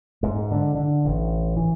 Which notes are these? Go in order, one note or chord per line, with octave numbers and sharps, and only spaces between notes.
G#2
D3
D3
A1
E3